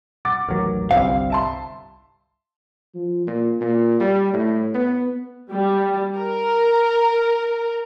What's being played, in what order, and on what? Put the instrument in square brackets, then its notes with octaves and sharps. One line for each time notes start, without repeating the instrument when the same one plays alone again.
[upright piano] F#5 D6 A6
[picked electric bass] A1 D#2 F#3 [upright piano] A#4
[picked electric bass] G1 C2 G3 [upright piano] C4 [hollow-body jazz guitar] F5
[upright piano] E5 A5 C6
[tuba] F3
A#2
A#2
G3
A2
B3
[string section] G3
A#4